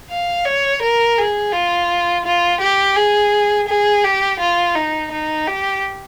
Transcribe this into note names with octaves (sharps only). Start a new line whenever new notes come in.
F5
C#5
A#4
G#4
F4
F4
G4
G#4
G#4
G4
F4
D#4
D#4
G4